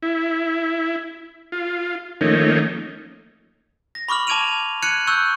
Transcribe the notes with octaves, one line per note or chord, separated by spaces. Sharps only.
E4
F4
D#3 F3 A3 A#3 C#4 D#4
A#6
B5 C#6 D6 F6 F#7
A5 D6 G#6 D7 D#7 F7
F7
F6 F#6 G#6 C#7 D#7 F#7
C#6 E6 F#6 G6